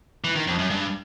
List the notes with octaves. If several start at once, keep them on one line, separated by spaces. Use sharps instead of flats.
E3
D#3
F2
F#2
G2